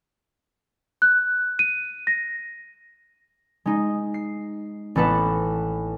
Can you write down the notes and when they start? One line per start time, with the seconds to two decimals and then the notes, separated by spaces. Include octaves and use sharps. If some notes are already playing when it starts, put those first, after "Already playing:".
1.02 F#6
1.59 D#7
2.07 A#6
3.66 G#3 D#4
4.14 C7
4.96 A1 B3 A4 B4